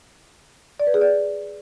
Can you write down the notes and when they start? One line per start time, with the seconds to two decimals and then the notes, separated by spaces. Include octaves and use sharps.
0.80 D5
0.87 B4
0.94 G#4
1.01 D5